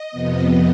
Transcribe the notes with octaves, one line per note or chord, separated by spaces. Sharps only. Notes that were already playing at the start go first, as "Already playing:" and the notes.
Already playing: D#5
F2 C3 F3 B3